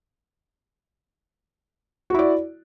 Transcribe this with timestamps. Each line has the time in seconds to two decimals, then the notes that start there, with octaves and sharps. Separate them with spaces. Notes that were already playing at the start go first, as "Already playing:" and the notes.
2.10 F#4
2.14 E4
2.19 D5